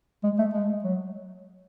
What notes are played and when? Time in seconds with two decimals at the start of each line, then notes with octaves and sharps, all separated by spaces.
0.24 G#3
0.39 A3
0.54 G#3
0.84 F#3